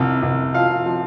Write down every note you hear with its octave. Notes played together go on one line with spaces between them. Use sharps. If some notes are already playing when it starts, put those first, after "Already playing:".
Already playing: C2 F3
C2
F3 F5
F3